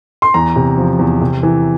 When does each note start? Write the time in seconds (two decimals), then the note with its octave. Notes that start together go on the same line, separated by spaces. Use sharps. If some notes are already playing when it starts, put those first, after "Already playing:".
0.22 C6
0.34 E2 A#5
0.56 C3
0.78 F3
0.99 E2
1.21 C3
1.43 E3